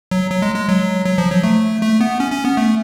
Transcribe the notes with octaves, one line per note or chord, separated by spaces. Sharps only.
F#3
F#3
G#3
G#3
F#3
F#3
F3
F#3
A3
A3
B3
C#4
C#4
B3
A3